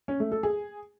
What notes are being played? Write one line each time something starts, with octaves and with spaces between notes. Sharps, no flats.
C#4
A3
A4
G#4